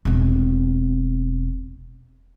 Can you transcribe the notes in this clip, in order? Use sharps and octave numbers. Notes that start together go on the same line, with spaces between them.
E1 C4